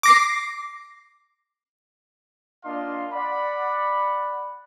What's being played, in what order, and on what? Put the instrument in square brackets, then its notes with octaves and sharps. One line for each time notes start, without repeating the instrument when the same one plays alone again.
[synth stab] D6 A#6 C7
[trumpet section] A#3 D4 F4 D#5 F5 C6
D5 F#5 B5